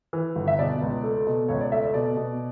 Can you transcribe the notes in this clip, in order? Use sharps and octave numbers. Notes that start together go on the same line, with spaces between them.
E3
G1
E5
B2 D5
C#2
A3
B2
C#2 C#5
D5
A3 E5
D5
B2 D5
B2